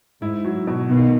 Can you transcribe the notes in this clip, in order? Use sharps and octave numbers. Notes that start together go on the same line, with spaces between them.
G#2 E4
F#3
B2
B2 D#3